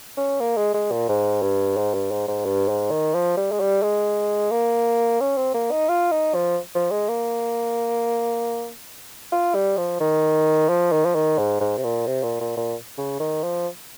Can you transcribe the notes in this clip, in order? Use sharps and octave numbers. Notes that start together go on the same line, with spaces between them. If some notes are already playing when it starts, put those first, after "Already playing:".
C#4
A#3
G#3
G#3
A#2
G#2
G2
G#2
G2
G#2
G#2
G2
G#2
D#3
F3
G3
G#3
G3
G#3
A#3
C#4
C4
A#3
D#4
F4
D#4
F3
F3
G#3
A#3
F4
G3
F3
D#3
F3
D#3
F3
D#3
G#2
G#2
C3
A#2
C3
A#2
A#2
A#2
C#3
D#3
F3